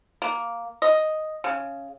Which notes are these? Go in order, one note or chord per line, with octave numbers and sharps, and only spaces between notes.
A#3
D#5
C#3